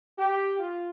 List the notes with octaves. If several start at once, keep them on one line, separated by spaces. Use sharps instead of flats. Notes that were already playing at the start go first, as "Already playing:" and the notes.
G4
F4